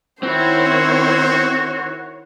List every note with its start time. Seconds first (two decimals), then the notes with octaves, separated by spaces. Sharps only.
0.23 D#3 C4 E4 F#4 C5 C#5